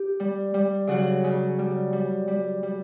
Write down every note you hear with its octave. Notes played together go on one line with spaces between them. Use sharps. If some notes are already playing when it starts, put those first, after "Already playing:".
Already playing: G4
G3
G3
C#3 F#3 F#4
C#3
G3
G3
G3
G3